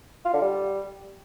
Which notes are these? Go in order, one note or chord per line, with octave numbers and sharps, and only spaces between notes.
F4
D3
G3